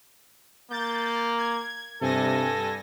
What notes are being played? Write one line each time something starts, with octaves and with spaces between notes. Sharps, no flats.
A#3 G6 A6
G#6
G2 C3 A4 G#5 A#6